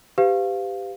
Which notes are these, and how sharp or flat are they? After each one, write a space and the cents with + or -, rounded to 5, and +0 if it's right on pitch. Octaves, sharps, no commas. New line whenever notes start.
G4 +5 B4 +45 F5 +0